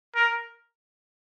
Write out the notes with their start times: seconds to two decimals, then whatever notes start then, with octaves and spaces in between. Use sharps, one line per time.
0.15 A#4